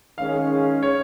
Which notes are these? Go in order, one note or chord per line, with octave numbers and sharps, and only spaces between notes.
D#3 G#3 C#4 G#4 F5
C#5